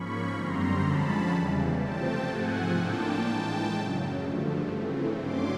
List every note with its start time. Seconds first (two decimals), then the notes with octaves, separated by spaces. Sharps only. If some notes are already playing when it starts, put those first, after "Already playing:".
Already playing: G#2 F3 A#3 C#4 B5 C#6
0.35 F#2 D3 G3 C4 A#5 C6
0.84 D3 F3 G#3 C#4 A5 B5
1.32 E2 C#3 E3 G3
1.80 C3 F3 A3 C4 G5 A5
2.29 G#2 F3 A3 C4 F#5 G#5
2.77 A2 F3 A#3 D4 G5 A5
3.26 A2 E3 G#3 G5 A5
3.74 F#2 C#3 F#3
4.22 G2 D3 F3 A3
4.71 C#3 E3 A3 C4
5.19 G2 D3 F#3 A3 C#4 C6 D6